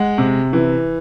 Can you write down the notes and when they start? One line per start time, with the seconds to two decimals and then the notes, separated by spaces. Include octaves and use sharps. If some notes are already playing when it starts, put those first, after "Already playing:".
Already playing: G#3 F#5
0.18 C3
0.53 E3